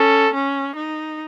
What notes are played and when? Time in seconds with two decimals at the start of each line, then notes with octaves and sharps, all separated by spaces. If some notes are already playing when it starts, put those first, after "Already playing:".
Already playing: C#4 A4
0.34 C#4
0.76 D#4